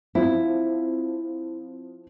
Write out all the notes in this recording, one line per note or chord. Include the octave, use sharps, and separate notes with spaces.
F3 C4 E4 F4